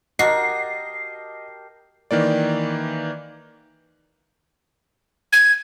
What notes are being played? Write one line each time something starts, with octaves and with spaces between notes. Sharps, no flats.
F#4 G4 A#4 D#5 A5 C7
D#3 E3 A#3 D5
G#6